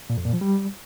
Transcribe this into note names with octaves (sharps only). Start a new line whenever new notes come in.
A#2
F2
A#2
F3
G3